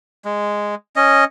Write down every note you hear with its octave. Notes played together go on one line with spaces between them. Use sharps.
G#3
C#4 D#5